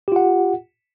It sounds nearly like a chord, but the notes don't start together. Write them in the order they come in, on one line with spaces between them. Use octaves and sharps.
G4 F4 F#5